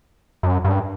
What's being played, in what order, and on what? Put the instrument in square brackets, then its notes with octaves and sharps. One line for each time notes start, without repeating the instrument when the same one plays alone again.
[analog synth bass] F#2
G2